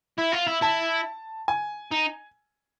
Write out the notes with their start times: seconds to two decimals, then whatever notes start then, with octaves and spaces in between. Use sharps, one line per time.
0.18 E4
0.33 F4
0.47 E4
0.62 E4 A5
1.48 G#5
1.91 D#4